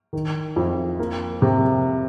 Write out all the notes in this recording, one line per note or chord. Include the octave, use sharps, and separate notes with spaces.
D#3
F2
A#3
C3